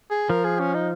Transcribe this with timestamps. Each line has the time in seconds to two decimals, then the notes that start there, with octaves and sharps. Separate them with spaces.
0.10 G#4
0.30 F3 A#4
0.44 G#4
0.59 C#4
0.74 D#4